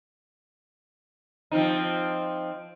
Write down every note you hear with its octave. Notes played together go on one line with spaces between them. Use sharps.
F3 C4 D#4